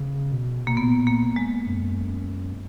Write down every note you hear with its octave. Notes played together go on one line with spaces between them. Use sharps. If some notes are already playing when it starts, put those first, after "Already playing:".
Already playing: C#3
B2
B2 A#3
A#2 B3
A#3
G#3
F#2
F2
F#2